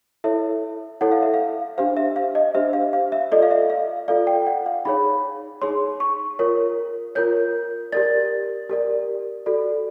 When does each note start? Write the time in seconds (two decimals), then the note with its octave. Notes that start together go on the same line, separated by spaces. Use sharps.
0.24 E4 A4 C#5 E5
1.01 E4 A4 C#5 F#5
1.12 F5
1.23 E5
1.34 F5
1.78 D4 G4 C5 F5
1.97 E5
2.16 F5
2.35 D#5
2.55 D4 G4 C5 E5
2.73 F5
2.93 F5
3.12 E5
3.32 F4 A4 D5 D#5
3.42 F5
3.51 E5
3.70 F5
4.08 F4 A4 D5 F5
4.27 G5
4.47 F#5
4.66 F5
4.85 D#4 G#4 C#5 B5
5.62 D#4 G#4 C#5 C6
6.00 C#6
6.39 F4 A#4 C#5
7.15 F4 A#4 C#5 G6
7.92 G4 A#4 D5 A6
8.70 G4 A#4 D5
9.46 F#4 A4 D5